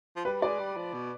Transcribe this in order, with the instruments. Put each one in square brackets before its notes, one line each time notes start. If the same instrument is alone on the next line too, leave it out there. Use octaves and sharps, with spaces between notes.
[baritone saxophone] F3
[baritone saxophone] G3 [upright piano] B4
[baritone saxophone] G#3 [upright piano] D5
[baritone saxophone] G3
F3
B2